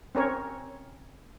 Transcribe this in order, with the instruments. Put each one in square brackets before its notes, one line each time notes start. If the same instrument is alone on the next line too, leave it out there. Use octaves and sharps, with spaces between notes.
[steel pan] C4 C#4 A#4 C#5